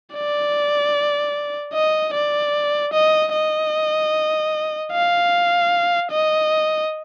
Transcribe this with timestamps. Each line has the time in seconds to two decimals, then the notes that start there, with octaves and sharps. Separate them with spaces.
0.14 D5
1.73 D#5
2.14 D5
2.93 D#5
3.33 D#5
4.92 F5
6.12 D#5